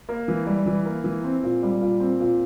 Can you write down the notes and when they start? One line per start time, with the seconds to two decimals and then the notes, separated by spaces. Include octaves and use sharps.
0.09 A#3
0.28 E3
0.47 G3
0.66 E3
0.86 A#3
1.04 E3
1.24 C4
1.43 A#2
1.63 G3
1.81 A#2
2.00 C4
2.20 A#2